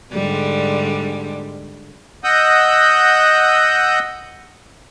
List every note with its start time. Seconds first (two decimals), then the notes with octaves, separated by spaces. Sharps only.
0.13 G#2 D3 G3
2.24 D#5 F#5 D#6 E6 G6